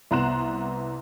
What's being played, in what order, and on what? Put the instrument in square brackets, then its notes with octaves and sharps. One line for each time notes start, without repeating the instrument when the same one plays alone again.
[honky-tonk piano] C2 B3 A#5 C6 F#6 E7